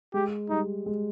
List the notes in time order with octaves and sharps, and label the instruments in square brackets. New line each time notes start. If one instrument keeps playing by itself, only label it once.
[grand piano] G#3 [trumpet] G4
[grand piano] G3 [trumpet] D#4
[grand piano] G#3